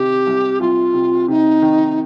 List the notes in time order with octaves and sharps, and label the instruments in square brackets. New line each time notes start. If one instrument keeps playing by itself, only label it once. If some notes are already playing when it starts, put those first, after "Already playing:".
Already playing: [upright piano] C3 D#3 [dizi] G4
[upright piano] C2
[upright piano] C2 [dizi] F4
[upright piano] C3
[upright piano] C3 [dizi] D#4
[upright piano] D#3